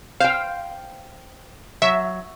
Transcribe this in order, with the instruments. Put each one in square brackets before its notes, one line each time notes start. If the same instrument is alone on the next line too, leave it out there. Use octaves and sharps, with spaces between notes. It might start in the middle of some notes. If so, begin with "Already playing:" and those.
[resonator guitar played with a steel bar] C5 G5 [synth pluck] F5
[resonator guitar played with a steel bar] F#3 [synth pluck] E5